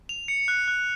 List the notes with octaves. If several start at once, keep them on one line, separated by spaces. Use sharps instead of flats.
F7
C#7
F#6
F#6